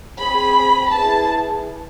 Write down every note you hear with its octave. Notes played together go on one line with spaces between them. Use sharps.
C4 G#4 B5
B3 E4 G#4 A5